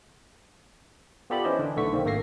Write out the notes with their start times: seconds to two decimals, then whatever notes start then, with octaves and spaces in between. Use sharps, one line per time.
1.30 B3 F4 G4 A4 D5 B5
1.44 E3 C#4 E4 C5 D#5
1.59 D3 E3 D4
1.77 B1 D3 A3 A4 C#6 B6
1.93 D#3 A#3 C4
2.05 G#1 A3 A#3 E5 A#6 C7